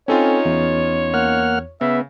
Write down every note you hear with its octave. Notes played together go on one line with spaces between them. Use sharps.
C4 C#4 D#4 F4 A4 C#5 G#5
E2
A#3 F#5 F6
C#3 B3 E5